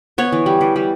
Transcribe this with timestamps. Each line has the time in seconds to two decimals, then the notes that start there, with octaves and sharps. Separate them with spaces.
0.18 B3 C#5
0.32 E3
0.46 G3
0.61 E3
0.76 G3